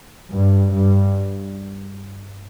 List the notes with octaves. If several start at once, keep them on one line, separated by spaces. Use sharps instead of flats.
G2
G2